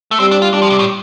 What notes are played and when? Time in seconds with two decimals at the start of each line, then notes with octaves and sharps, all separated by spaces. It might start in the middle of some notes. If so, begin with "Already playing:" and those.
0.11 A3
0.20 G3 C4
0.31 D4
0.42 F4
0.53 G3 D4
0.62 F3
0.70 C3
0.79 A2